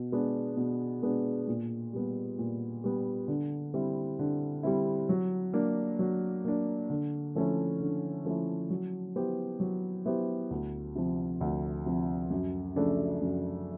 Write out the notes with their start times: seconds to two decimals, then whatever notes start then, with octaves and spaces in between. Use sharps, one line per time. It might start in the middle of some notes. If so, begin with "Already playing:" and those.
Already playing: B2
0.12 G#3 B3 D4
0.57 B2
1.02 G#3 B3 D4
1.48 A#2
1.93 G3 B3
2.39 A#2
2.84 G3 B3
3.28 D3
3.74 G3 C4 E4
4.19 D3
4.63 G3 C4 E4
5.09 F#3
5.53 A#3 D4
5.99 F#3
6.45 A#3 D4
6.90 D3
7.35 F3 A3 C#4 E4
7.80 D3
8.25 F3 A3 C#4 E4
8.70 F#3
9.16 B3 E4 G4 C5
9.60 F#3
10.05 B3 E4 G4 C5
10.51 D2
10.95 C3 F3
11.41 D2
11.86 C3 F3
12.31 F#2
12.76 C#3 F3 A3 D4
13.22 F#2